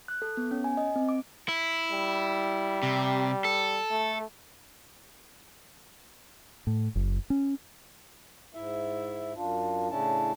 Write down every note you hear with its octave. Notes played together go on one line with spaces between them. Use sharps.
F#6
A4
B3
C#4
G#5
D#5
C4
D6
E4
G3
C3
A4
A3
A2
F#1
C#4
G#2 E4 E5
F#2 D4 F4
A2 C#3 C#4 D4 E4 A5